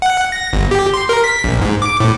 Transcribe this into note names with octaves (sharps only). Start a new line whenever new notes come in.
F#5
A#6
G1
G4
C6
A#4
B6
A#1
G#2
D6
A2